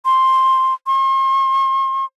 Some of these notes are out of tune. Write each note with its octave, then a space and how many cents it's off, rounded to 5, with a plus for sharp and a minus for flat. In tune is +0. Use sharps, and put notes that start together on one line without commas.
C6 +5
C6 +45